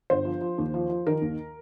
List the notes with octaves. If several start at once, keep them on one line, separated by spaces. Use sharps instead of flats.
G1 C5
F3
F3
D#2
F3
F3
D#3 A#4
D#2